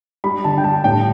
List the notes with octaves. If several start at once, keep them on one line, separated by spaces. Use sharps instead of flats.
G3 B5
D3 A5
G5
G3 A5
A2 G5